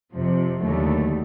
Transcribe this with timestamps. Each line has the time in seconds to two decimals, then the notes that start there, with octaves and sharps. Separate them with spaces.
0.12 F2 C3 F3
0.60 D#2 D3 F#3 A3